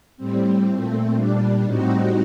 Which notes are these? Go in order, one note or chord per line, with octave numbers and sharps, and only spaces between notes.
A2 G3 C4
A#2 A3 C4
A#2 G3 D4
A2 G3 C4 D#4 F#4